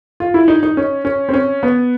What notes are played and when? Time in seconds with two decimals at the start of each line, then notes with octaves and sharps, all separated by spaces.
0.20 F4
0.34 E4
0.48 D#4
0.63 D#4
0.77 C#4
1.05 C#4
1.29 C4
1.34 C#4
1.63 B3